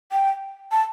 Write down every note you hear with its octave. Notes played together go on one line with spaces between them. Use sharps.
G5
A5